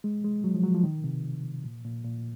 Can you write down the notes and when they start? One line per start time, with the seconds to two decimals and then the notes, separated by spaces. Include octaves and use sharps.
0.04 G#3
0.24 G#3
0.44 F#3
0.54 F3
0.63 F#3
0.74 F3
0.84 D#3
1.04 C3
1.64 A#2
1.85 A#2
2.04 A#2